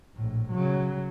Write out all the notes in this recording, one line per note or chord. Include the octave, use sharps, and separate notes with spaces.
A#1 A2
C#3 F#3